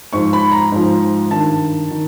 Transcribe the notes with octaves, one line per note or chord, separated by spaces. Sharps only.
G#2 F3 C#6
B5
A#5
G#2 F3
G2 D#3 A5
D#3